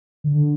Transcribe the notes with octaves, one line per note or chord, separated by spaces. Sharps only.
D3